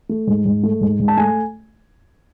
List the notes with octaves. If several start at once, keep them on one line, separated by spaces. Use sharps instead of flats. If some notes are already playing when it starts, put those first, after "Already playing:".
A3
G#2
G#2
A3
G#2
G#2
A5
A3 G#5